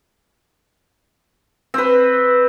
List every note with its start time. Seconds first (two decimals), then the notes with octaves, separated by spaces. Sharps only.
1.74 C4 B4